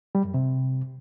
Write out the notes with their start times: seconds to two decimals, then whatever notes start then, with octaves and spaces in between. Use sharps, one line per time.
0.15 G3
0.24 F#2
0.34 C3